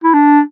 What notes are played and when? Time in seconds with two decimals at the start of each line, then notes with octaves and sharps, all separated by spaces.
0.04 E4
0.14 D4